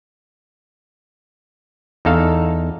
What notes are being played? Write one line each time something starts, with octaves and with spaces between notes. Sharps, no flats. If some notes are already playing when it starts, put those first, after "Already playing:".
E2 D#4 A4 F5